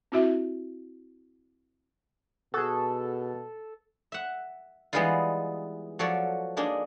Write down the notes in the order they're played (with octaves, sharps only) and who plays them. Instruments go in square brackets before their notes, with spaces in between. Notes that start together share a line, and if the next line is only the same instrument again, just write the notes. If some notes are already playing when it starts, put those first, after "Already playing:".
[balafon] C4 E4 F#4 E5
[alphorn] B2 [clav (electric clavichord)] F#4 G#4 [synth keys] A4
[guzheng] E5 F#5
E3 G3 G#3 B3 D#4 F4
F3 F#3 F#4 A4 C#5 D5
G#3 A#3 D4 D#4 G#4